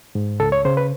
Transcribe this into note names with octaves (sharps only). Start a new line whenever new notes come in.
G#2
C#2 A4
C#5
C#3 C5
B4